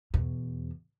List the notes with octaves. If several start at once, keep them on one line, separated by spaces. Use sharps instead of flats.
E2 B2